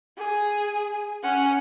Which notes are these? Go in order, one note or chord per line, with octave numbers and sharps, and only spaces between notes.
G#4
C#4 F#5